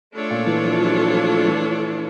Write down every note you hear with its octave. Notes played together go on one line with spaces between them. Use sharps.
A3 D4 F4 A4 C#5
A#2
E3
F3
F#3
F3
E3